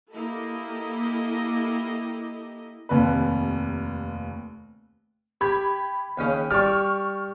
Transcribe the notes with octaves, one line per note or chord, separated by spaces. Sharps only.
A#3 E4 G4 A4 D#5
F1 D#2 C3 B4
G4 B5 G#6
D#2 C#3 C#4
G3 A5 C#6 D6 F6